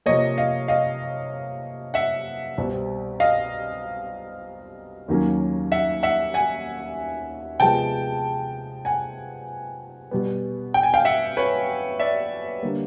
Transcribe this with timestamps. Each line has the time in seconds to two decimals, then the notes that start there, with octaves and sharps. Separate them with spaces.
0.06 C3 F3 A#3 C#5 D#5
0.38 D#5 F5
0.68 D#5 F5
1.94 E5 F#5
2.58 C2 B2 G3 C4
3.20 D#5 F5
5.08 D#2 D#3 F#3 A#3 C#4
5.72 E5 F#5
6.03 E5 F#5
6.34 F#5 G#5
7.60 C3 F3 G#3 B3 G5 A5
8.85 F#5 G#5
10.11 B2 G3 B3
10.74 G5
10.83 G#5
10.94 F5 G5
11.05 E5 F#5
11.37 B4 C#5
12.00 D5 E5
12.63 D3 G3 A#3